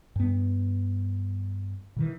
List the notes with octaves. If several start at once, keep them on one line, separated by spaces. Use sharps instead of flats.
G2 B3
B2 D#3 E3